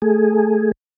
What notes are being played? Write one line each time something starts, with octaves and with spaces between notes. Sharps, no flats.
A3 G#4